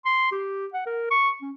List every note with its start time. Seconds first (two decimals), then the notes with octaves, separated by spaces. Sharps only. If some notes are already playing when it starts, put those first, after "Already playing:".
0.05 C6
0.32 G4
0.74 F#5
0.87 A#4
1.11 C#6
1.42 C#4